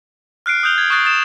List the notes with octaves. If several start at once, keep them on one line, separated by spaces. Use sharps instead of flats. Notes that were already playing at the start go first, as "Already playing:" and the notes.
F6 F#6 C7 D7
D#6 F#6 G6 F7 G7
G#6
C#6 D#6 F#6 A6 C7
D#6 A6 E7